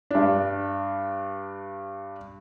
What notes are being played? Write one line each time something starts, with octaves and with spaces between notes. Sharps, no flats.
G2 D4